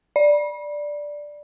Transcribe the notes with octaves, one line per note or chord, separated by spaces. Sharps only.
D5